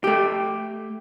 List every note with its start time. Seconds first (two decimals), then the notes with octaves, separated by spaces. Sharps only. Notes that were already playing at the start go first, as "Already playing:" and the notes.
0.04 A3 G4